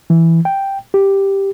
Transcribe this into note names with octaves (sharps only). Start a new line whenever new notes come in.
E3
G5
G4